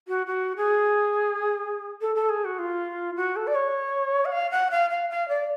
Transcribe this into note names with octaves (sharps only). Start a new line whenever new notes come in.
F#4
F#4
G#4
A4
A4
G#4
F#4
F4
F#4
A4
D5
C#5
F#5
F5
F#5
F5
F5
F5
D5